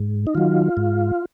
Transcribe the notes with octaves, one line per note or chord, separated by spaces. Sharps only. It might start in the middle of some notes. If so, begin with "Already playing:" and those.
Already playing: G#2
D#4
D#3 F#3 F4
G#2